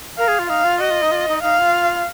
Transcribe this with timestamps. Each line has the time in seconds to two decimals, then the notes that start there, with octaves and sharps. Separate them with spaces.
0.18 A#4 F5
0.28 G#4
0.39 F4
0.49 D#4 F5
0.64 F4
0.80 F#4 D#5
0.91 F4
1.02 D#4
1.11 F4
1.28 D#4
1.43 D#4 F5
1.60 F4